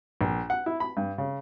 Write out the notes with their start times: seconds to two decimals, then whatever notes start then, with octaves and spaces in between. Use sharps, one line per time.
0.21 A#1
0.50 F#5
0.66 E4
0.80 B5
0.97 G2
1.18 C#3